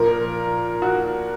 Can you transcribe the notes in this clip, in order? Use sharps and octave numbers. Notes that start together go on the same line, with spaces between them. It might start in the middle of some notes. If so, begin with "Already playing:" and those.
Already playing: A#2 F3 A#4
F#4